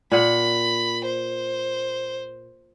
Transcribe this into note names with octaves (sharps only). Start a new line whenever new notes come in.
A#2 F#5 B5
C5